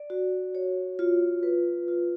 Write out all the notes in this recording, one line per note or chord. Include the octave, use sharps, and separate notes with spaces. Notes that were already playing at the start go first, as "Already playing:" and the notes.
Already playing: D5
F#4
C#5
F4
B4
F4